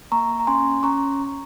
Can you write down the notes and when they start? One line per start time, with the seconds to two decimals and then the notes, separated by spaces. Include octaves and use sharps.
0.12 A#3 A#5 C#6
0.40 A#5
0.47 C#4 G#5 C6
0.83 C#4 A#5 C#6